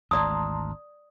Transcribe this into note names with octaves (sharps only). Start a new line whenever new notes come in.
G#1 D2 D5 A5 A#5 C6 D#6